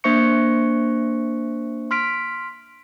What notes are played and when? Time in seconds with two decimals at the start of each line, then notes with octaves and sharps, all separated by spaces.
0.04 A#3 D4 C5 E5 C#6 C#7
1.91 C6 F6 B6 D7